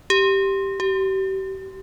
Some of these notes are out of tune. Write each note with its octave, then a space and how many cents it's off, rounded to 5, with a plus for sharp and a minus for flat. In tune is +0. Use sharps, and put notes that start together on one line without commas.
G4 -5
G4 -35